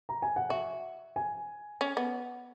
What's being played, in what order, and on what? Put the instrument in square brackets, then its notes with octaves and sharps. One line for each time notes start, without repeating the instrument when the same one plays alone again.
[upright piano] A#5
G#5
F#5
[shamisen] F#4 [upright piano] E5
[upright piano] G#5
[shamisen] C#4
B3